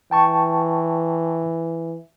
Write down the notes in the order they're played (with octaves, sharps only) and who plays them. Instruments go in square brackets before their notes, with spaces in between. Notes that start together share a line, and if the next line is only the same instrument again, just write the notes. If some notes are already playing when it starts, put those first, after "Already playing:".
[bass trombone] E3 [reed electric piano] G5 A5 C#6